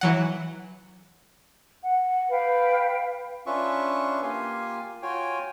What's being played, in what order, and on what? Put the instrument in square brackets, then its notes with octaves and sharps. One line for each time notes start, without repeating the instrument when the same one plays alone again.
[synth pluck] E3 F#3 F#5
[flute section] F#5
B4 F5 G5
[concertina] C#4 D4 F4 B4 E5 C#6
A#3 F4 G4 F5 G#5
F4 F#4 C#5 G5 G#5